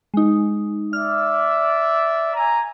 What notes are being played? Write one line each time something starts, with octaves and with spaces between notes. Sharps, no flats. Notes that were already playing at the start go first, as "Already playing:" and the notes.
G#3 D#4
D5 E5 F6
G#5 A#5